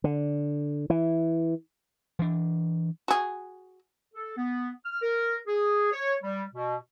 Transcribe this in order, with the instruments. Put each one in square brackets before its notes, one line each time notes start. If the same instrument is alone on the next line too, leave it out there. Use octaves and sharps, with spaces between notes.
[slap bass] D3
E3
E3 D4
[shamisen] F#4 G#4
[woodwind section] A4
B3
F6
A#4
G#4
C#5
G3
B2